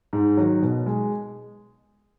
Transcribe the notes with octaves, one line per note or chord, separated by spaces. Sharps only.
G#2
D#3 F#3
B2
G#3